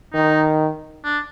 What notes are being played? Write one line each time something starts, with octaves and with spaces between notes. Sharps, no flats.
D#3 D#4
D4